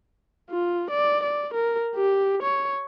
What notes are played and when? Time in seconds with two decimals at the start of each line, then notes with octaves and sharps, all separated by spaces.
0.50 F4
0.91 D5
1.23 D5
1.54 A#4
1.96 G4
2.43 C#5